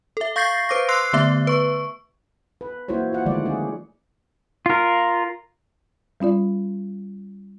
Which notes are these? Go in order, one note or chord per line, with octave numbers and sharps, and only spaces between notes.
A4 E5
F5 C#6 G6 A6 A#6 C7
B4 C5 D6 A#6
C6 E6 F#6 C7
D3 A3 B3 E5
B4 C#6
B4
A#3 E4 F#4 C5 C#5
F4 F#5
D3 D#3 F3 G#3 A3 D5
C#4 G#4
F4 A#4
G3 C#4 F4 D5